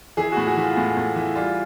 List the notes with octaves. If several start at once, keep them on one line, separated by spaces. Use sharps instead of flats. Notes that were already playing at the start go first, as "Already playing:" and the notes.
E3 G#4
A2 F#4
F#4
E3 F4
A2
A2
E3
G3 F4